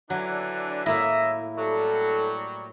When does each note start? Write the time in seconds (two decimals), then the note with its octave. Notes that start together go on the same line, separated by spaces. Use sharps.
0.10 D3 E3 F#3 D4
0.86 A2 A#3 E4 D#5 E5
1.58 F#3 G3 A4